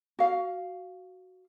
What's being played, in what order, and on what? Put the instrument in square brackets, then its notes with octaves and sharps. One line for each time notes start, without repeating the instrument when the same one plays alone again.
[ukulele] F#4 F5